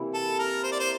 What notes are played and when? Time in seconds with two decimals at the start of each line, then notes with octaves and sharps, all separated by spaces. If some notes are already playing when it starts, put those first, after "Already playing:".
Already playing: C3 E3 A#3 E4
0.14 A4
0.39 A#4
0.64 C5
0.72 D5
0.80 C5